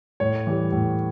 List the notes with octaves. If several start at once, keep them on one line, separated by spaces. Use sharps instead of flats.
A2 C#5
E3 G3
A2